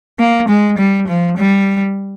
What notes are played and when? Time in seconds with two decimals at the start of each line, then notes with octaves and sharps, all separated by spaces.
0.19 A#3
0.49 G#3
0.78 G3
1.08 F3
1.38 G3